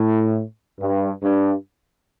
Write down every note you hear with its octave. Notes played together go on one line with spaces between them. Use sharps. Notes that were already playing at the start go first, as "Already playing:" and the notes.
Already playing: A2
G2
G2